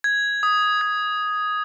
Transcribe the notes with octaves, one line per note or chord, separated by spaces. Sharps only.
G#6
D#6
G#6